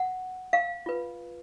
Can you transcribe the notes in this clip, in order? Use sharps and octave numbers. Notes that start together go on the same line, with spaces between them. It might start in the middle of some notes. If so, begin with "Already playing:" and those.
Already playing: F#5
F5
F4 B4